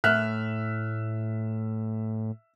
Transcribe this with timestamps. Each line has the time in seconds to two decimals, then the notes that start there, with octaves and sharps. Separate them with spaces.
0.04 A2 E5 F6 F#6